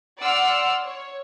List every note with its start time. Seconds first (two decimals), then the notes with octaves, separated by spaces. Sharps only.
0.21 D5 F#5 C6 E6 F6
0.85 C#5